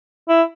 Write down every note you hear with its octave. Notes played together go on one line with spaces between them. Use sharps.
E4